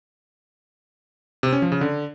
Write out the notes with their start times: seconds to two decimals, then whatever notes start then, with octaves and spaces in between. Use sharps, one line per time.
1.43 C3
1.53 C#4
1.62 F3
1.72 C#3
1.81 D3